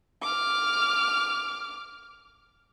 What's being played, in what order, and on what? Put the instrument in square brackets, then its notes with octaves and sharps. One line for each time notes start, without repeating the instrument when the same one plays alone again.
[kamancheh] D6 F6